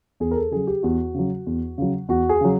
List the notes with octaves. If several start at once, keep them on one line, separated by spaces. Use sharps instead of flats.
E2 G#4
A#4
A4
C#3 F#3 G#4
G4
E2 F#4
C#3 F#3
E2
C#3 F#3
E2 F#4
G#4
C#3 F#3